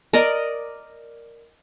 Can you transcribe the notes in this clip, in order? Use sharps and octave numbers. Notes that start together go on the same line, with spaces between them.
A#4 D5 D#5